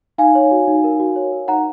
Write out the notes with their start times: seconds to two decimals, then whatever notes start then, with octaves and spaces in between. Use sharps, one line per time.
0.18 D#4 F5 G#5
0.35 C#5
0.51 F#4
0.68 D#4
0.84 A#4
1.00 F#4
1.16 C#5
1.32 A#4
1.48 D#4 F#5 A#5